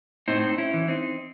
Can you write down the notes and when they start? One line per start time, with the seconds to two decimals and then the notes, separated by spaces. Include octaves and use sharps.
0.28 A2 C4 D#4
0.58 C#4 E4
0.74 E3
0.88 C4 D#4